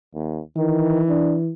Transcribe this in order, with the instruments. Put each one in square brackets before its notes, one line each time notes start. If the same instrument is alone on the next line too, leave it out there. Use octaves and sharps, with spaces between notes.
[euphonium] D#2
[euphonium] D#3 [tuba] E3
[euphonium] D4